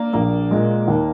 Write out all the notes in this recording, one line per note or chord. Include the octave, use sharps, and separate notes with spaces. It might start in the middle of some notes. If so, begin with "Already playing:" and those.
Already playing: A#3 D4 A#4
A#1 A#3
A#2 G#3
D#2